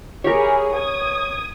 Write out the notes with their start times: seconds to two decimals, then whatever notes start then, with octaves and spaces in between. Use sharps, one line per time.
0.24 E4 G4 G#4 A#4 C#5
0.72 D#6 G#6